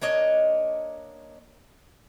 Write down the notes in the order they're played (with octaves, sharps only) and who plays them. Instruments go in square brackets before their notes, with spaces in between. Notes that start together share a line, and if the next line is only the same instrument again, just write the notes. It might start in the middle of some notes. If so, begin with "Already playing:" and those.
[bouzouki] A#3 D4 C#5 D#5